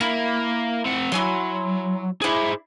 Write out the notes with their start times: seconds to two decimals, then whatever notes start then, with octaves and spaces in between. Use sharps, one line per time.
0.01 A#3 E4
0.85 C4 F#5
1.12 F#3 E4 G#5 C6
2.21 E4 G#4 C5 D5